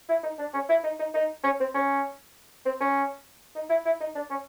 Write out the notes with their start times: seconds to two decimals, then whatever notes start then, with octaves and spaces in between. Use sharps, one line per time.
0.09 E4
0.23 D#4
0.39 D4
0.54 C#4
0.69 E4
0.84 D#4
0.99 D#4
1.14 D#4
1.44 C#4
1.60 C4
1.74 C#4
2.65 C4
2.80 C#4
3.56 D#4
3.70 E4
3.85 E4
4.00 D#4
4.15 D4
4.30 C#4